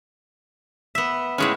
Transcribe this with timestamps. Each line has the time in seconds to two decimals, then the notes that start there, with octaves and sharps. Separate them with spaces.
0.95 B3 E5
1.38 A2 G#3 C#4